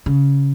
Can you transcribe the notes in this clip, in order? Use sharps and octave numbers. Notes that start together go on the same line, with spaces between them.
C#3